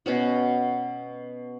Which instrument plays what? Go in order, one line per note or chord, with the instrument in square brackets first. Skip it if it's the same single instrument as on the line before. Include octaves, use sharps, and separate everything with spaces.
[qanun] B2 C#4 F#4